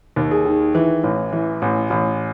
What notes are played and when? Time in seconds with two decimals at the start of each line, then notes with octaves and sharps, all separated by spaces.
0.16 D#2
0.31 G#4
0.46 D#3
0.75 E3
1.04 A1
1.33 E3
1.62 A1
1.90 A1